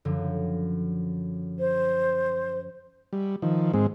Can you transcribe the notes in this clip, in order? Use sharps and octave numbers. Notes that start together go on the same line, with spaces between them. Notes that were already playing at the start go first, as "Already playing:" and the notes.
F#2 D3 F3
C5
G3
D#3 F3
G#2 G#3 C4